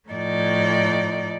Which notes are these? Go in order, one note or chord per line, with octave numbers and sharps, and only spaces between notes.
A2 F3 D#4 D5